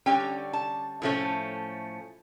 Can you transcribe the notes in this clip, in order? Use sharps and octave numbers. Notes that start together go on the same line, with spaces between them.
D3 G3 C#4 G5
A5
A2 F3 A3 C#4